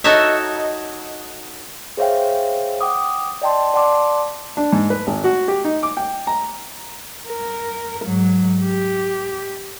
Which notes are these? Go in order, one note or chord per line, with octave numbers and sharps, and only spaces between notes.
D#4 F#4 A4 C#5 E5
G#4 C5 C#5 E5 F5 G5
F#5 G5 D6 D#6
D5 D#5 G5 A5 C6
D5 F#5 A5 C6 D6
D4
G#2
B4
G#1
F#4
G4
D#4
D6
G5
A#5
A#4
G#2 F#3
G4